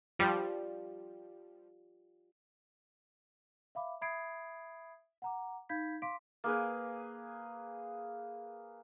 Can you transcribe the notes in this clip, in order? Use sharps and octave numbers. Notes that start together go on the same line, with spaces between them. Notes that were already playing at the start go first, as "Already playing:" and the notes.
F3 G3 F4 G4 D5
E5 F5 B5 D6
E5 B5 D#6 G#6 C7 D7
F#5 A#5 D6
D#4 F5 B5 G6 G#6 B6
F5 C6 D6 B6 D7
A#3 G#4 B4